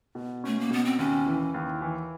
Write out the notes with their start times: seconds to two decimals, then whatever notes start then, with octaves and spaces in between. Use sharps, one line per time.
0.15 B2
0.44 A3 C#4
0.60 A#3
0.70 B2 B3
0.85 C4
0.99 D#2 C#4
1.26 E3
1.54 D#2
1.81 E3